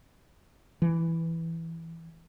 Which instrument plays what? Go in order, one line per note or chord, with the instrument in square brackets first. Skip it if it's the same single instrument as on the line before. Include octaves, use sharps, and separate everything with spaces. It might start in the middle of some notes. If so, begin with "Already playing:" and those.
[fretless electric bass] E3